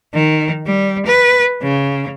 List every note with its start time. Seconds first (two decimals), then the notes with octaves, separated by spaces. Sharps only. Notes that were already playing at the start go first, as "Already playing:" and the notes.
0.14 D#3
0.66 G3
1.06 B4
1.62 C#3